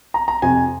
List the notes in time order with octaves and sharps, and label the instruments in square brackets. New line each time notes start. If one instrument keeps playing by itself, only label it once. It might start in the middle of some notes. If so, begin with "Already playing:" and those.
[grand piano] A#5
A#5
F2 C3 F3 G#5